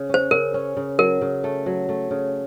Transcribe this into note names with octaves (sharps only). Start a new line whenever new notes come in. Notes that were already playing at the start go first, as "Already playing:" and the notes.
Already playing: C#3
C#4 C5
C#3 A#4
C#4
C#3
F#3 A#4
C#3
A3
F#3
A3
C#3